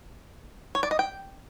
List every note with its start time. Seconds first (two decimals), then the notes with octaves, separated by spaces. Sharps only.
0.75 C#5
0.83 D5
0.91 D#5
0.99 G5